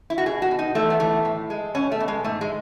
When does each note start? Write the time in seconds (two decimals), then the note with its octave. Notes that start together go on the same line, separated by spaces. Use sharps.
0.10 E4
0.18 F#4
0.26 B2 G#4
0.42 F#4
0.51 B2
0.59 D#4
0.75 E2 A3
0.90 B3
1.00 E3 A3
1.25 A2
1.50 G#3
1.75 B2 C#4
1.92 A3
2.00 B2
2.08 G#3
2.24 G#2 A3
2.41 G#3